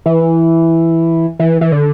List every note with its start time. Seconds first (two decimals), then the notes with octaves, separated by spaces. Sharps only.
0.06 E3
1.40 E3
1.61 E3
1.72 D3